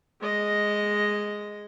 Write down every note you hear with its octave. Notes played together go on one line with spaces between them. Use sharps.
G#3 D#5